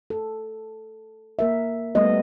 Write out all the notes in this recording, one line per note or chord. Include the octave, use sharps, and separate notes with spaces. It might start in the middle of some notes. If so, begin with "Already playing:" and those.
A4
A#3 A#4 E5
G3 A3 B3 A4 D#5